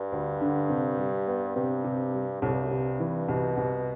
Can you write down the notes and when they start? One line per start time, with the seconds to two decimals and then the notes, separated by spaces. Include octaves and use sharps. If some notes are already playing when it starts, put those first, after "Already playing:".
Already playing: G2
0.12 D2
0.41 D3
0.70 C3
0.98 G3
1.27 B3
1.56 G2 C3
1.84 C3
2.14 G3
2.42 C2 A2
2.53 G2
2.63 F#2
2.71 G2 C3
3.00 E3
3.28 C2 B2
3.57 C2